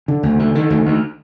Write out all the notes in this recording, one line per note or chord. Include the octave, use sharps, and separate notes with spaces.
D3
D2
D3
D3 D#3
D2
D2